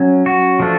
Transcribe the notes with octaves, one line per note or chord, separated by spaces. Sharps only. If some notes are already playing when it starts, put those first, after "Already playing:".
Already playing: F#3 C#4
F#4
F3 A3 D4